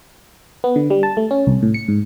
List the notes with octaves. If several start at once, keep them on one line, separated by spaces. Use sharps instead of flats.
B3
D3
G3
A5
A3
C#4
C2
A2
C#7
G#2